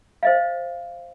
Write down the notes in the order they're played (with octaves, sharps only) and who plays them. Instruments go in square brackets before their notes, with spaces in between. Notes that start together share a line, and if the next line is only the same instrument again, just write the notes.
[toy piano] C5 D#5 F5